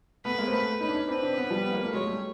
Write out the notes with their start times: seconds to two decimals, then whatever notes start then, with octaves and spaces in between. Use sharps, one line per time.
0.25 A3 B3 B4
0.39 G#3 A#3
0.47 C4
0.52 A3 B3 B4
0.80 C#4 D#4 B4
0.89 D4
0.94 C#4 D#4
1.09 C4 D4 B4
1.23 C4 D4
1.36 B3 C#4
1.50 F3 G3
1.63 B3
1.73 A#3
1.83 A3
1.93 F#3 G#3 C#5
2.07 G3 A3